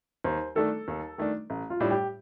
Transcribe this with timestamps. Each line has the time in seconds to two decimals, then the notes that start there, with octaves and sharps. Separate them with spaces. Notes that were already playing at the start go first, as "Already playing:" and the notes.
0.24 D#2 C5
0.55 D#3 A3 D4 A4
0.88 D#2
1.18 D#3 A3 D4
1.50 A1
1.70 F4
1.80 A2 G3 D4
1.91 G4